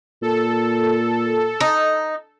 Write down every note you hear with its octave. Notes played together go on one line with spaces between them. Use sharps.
A#2 A4
D#4